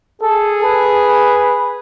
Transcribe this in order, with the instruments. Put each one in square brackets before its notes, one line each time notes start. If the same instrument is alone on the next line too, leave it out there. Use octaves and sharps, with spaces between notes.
[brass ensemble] G#4 [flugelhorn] A4
[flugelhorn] B4